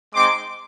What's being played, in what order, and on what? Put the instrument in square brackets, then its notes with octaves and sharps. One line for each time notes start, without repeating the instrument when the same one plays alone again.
[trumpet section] G#3 C4 D#4 C6 D6